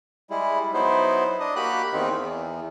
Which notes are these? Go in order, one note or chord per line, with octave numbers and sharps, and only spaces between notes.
G3 G#3 E4
F#3 B3 D#4 E4 C5
D4 D#5
A#3 F#4 G4 B5 F#6
E2 D#3 A#3 C4 D#4
E2